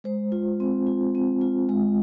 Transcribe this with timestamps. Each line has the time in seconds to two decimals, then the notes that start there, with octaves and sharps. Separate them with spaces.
0.04 G#3 C5
0.32 F4
0.60 C4
0.87 F4
1.15 C4
1.41 F4
1.69 G#3